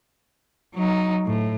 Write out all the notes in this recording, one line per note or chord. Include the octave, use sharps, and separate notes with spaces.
F#3 D#4
A2